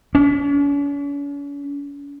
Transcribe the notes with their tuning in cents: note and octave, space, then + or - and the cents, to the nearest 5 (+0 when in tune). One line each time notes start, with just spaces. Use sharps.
C#4 +45